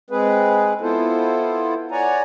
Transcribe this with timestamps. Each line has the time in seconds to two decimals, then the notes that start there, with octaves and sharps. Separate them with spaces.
0.10 G#3 C4 G#4 B4
0.81 B3 E4 F4 A4 C5
1.91 C#5 D5 F#5 G#5 A#5